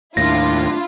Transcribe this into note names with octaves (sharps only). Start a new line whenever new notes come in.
D#2 A2 D4 E4 F4 A#6